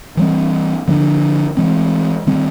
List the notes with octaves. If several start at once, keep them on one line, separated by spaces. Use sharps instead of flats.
E3 G3 C4
D3 F3 A3 D4
E3 G#3 C4
D#3 G3 C4